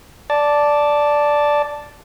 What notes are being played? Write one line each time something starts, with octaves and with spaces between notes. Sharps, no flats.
D5 A5